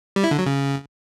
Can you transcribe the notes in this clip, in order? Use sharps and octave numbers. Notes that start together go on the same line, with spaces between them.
G3
E4
D3
F#3
C#3